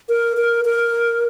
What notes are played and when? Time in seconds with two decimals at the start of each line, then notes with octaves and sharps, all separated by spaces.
0.09 A#4
0.37 A#4
0.65 A#4